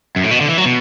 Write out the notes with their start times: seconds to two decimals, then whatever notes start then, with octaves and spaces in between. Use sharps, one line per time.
0.16 F#2
0.24 A2
0.31 B2
0.41 D3
0.48 E3
0.58 F#3
0.65 B2